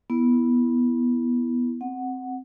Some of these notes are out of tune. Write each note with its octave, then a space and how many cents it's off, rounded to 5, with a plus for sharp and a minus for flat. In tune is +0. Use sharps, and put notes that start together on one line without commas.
B3 -10 E4 +0
C4 +0 F#5 +0